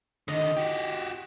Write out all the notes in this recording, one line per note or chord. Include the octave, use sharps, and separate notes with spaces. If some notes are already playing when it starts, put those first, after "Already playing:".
D3 D#3 D#5
F#4 G4